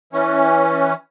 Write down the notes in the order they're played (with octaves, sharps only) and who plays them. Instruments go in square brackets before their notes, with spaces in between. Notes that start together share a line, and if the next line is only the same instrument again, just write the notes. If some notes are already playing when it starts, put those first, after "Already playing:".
[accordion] E3 C#4